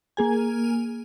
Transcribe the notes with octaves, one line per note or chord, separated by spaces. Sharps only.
A#3 G#4 G#5